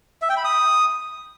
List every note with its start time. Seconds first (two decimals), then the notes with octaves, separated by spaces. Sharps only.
0.22 E5
0.29 G5
0.37 B5
0.44 D#6